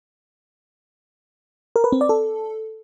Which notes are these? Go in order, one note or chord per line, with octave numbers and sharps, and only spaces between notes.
A#4
B4
C4
D5
A4